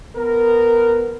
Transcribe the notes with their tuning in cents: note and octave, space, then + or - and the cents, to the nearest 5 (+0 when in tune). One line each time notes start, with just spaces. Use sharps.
B3 +0 A#4 -10